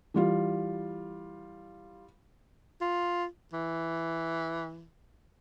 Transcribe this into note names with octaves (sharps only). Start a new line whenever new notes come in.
E3 G3 F4
F4
E3